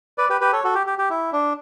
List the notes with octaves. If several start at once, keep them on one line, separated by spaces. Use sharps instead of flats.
B4 D5
G4 B4
G4 B4
A4 C#5
F#4 A4
G4
G4
G4
E4
D4